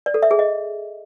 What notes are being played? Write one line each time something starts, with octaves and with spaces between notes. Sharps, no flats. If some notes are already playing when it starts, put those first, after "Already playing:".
D5
A4
E5
G#4
D#5